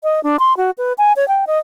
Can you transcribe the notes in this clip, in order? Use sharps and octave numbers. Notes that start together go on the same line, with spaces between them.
D#5
D4
C6
F#4
B4
G#5
C#5
G5
D#5